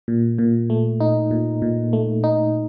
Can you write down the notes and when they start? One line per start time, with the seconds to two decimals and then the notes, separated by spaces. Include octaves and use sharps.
0.08 A#2
0.38 A#2
0.70 A3
1.01 D#4
1.31 A#2
1.62 A#2
1.93 A3
2.24 D#4